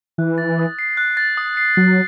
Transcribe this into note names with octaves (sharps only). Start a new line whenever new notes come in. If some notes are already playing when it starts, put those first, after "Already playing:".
E3 F#6
A6
D#6
C7
F#6
A6
D#6
C7
F#3 C7